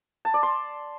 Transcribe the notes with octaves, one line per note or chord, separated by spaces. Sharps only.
A5
D5
C6